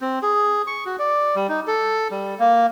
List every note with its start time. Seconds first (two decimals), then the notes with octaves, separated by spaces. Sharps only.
0.01 C4
0.22 G#4
0.67 C#6
0.86 F#4
0.99 D5
1.36 G3
1.49 D#4
1.67 A4
2.11 G3
2.39 A#3